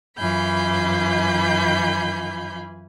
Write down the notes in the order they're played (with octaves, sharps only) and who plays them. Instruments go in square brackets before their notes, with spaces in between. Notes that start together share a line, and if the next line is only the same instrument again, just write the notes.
[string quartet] F#2 E3 F4 G#5 B5 G6